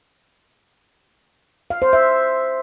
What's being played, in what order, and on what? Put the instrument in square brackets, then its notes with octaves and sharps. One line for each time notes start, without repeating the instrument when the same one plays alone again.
[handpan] F5
C5
E5